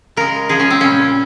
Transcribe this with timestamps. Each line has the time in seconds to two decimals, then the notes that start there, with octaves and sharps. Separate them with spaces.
0.17 C#3 G#3 A#4
0.49 C#3 F3 G#3 G#4
0.59 C#4
0.71 C4
0.80 A#2 G3 C#4